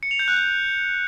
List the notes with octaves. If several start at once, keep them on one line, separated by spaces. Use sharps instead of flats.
C#7
F7
G6
F#6
G6